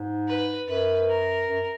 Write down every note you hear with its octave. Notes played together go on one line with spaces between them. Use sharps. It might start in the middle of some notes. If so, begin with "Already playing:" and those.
Already playing: G#2
B4
F#2 B4
A#4
F#2